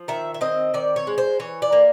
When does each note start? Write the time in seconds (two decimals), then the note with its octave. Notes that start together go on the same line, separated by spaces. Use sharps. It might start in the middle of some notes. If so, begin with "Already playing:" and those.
Already playing: F3
0.08 D#3 E5
0.34 E5
0.41 C4 D#5
0.74 D#3 D5
0.96 C#5
1.07 G#3
1.18 C5
1.40 E3 C#5
1.62 D5
1.72 A#3